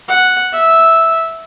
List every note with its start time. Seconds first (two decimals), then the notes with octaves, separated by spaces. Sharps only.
0.08 F#5
0.53 E5